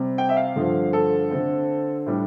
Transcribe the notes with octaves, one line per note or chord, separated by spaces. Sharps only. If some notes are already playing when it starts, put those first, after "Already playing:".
Already playing: C3 G3 C4
G5
E5
F5
G2 D3 F3 C4
A4
D3 A3 C4
A2 G3 D4